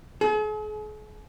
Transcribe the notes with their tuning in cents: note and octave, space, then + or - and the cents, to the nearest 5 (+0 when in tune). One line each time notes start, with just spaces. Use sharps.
G#4 +45